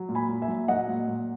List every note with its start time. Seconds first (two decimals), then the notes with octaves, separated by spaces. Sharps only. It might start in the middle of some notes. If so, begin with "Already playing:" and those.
Already playing: F#3
0.09 A#2
0.15 G#5 B5
0.29 A#2
0.42 E5 G#5
0.48 F#3
0.68 F#3 D#5 F#5
0.88 A#2
1.07 A#2